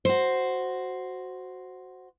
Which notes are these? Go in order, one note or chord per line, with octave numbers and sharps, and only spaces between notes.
F#4 C5